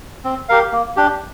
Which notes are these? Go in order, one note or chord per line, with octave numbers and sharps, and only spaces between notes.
C4
G4 A#4 F5
A#3
D4 G4